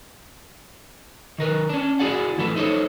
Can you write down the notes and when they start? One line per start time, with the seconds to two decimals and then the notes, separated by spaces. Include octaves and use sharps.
1.38 D#3 A#4 B4
1.69 C#4 D4
1.99 E4 F#4 G#4 D5 F#5
2.38 A2 E3 F3 A4 B4
2.56 D#4 A4 C5 C#5